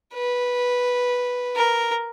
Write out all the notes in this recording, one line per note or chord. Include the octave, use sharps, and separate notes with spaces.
B4
A#4